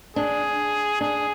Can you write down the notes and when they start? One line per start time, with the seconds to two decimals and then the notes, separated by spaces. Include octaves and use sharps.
0.16 D4 G#4
1.01 D4 G#4